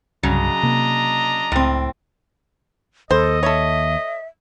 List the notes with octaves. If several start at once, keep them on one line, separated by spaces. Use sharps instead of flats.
C2 G2 C#3 F#3 D4 D#5 A#5
C3 A#3
C#2 A2 C4
D#2 A4 C5 D#5
A4 C#5 E5